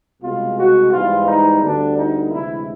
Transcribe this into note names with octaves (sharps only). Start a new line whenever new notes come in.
C2 B2 G#3 B3 F4
F#4
G#2 E3 G3 B3 F4
D#4
D2 D3 G3 B3 D4
D#4
D2 C3 E3 G#3 E4